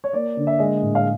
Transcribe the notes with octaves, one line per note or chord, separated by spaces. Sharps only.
C#5
A#3 D5
D3
E5
G#3 D#5
A2
F5